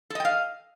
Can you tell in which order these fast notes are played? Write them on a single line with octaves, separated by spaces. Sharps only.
A4 D#5 G5 F5